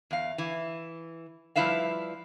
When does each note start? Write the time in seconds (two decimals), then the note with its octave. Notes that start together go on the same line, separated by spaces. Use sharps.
0.11 E2 F5
0.38 E3
1.56 F3 G3 E4 B4 E5 F5